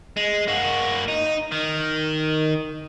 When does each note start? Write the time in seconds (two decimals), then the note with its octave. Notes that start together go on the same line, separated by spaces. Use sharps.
0.17 G#3
0.48 A#3 F#4
1.08 D#4
1.51 D#3